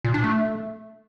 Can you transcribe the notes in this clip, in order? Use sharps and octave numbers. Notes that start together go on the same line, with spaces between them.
A#2
D4
A3